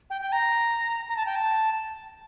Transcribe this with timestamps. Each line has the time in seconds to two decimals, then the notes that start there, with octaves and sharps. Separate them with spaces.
0.10 G5
0.21 G5
0.32 A#5
1.08 A#5
1.17 A5
1.26 G5
1.36 A5